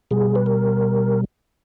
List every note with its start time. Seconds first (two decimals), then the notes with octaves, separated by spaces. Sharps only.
0.11 B2 G3 G#4
0.35 B4
0.46 A#4